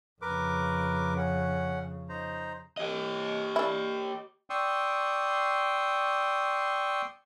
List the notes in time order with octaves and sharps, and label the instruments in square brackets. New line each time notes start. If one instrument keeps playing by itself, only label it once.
[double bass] F2 C#3 [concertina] A#4 B4 D6
[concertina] C#4 F#5
D#4 C5 A#5
[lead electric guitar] G4 D#5
[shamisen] D4 E4
[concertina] D5 G5 C6 C#6 D#6 E6